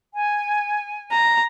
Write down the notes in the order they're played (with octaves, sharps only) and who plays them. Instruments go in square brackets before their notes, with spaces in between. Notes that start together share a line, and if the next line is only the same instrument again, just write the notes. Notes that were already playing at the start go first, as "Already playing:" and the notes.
[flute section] G#5
[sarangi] A#5